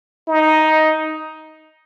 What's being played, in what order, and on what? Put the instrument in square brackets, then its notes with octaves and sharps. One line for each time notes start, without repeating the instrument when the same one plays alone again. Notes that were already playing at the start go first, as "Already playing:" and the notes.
[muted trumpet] D#4